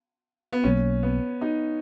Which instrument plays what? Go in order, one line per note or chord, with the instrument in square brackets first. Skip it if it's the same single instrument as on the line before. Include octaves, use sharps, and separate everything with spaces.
[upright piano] B3
[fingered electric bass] B1 B2 F#3 A#3 [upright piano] C#4
[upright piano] B3
D#4